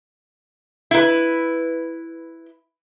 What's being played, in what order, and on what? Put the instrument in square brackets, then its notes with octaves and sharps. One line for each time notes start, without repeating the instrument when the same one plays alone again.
[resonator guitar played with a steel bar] E4 B4